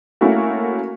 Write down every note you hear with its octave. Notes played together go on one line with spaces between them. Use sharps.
A3 A#3 C#4 E4 F#4